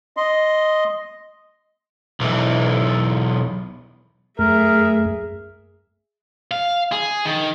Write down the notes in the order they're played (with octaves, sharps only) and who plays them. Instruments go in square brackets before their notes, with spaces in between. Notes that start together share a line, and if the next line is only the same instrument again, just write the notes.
[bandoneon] D#5 C6
[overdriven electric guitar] B1 E3
[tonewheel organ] F#2 A3 [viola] G#4 E5 [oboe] A#4
[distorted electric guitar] F5
G#4
D#3